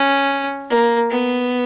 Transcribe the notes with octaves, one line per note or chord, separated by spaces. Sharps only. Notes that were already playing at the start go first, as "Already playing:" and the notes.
Already playing: C#4
A#3
B3